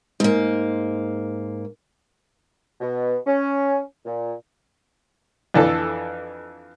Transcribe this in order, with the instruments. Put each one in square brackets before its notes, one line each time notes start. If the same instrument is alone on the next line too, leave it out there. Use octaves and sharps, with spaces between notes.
[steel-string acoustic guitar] G#2 A#3
[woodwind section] B2
C#4
A#2
[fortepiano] F2 E3 D4 A4